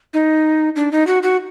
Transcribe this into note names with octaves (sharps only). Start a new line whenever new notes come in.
D#4
D4
D#4
F#4
F#4